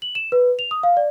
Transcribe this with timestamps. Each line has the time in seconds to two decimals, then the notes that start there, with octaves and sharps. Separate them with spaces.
0.02 F#7
0.15 E7
0.32 B4
0.59 F7
0.71 D#6
0.83 F5
0.97 D5